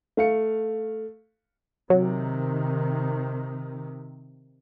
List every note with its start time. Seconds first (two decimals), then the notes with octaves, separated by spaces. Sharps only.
0.17 A3 F5 C#7
1.90 C3 D#3 F#3